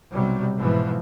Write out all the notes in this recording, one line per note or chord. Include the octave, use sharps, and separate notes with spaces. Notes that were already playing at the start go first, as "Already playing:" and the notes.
B1 C3 F#3 G3
G#2 B2 E3 F3